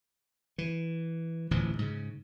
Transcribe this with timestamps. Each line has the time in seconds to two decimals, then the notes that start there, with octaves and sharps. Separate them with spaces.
0.58 E3
1.51 D1 A1 E3 F3
1.79 G#2 C#3